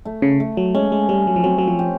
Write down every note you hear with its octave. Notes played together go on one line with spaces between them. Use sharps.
A3
C#3
A3
F#3
G#3 C#4
G#3
G3 C#4
F#3
F3
F#3 C4
F#3
F3
G4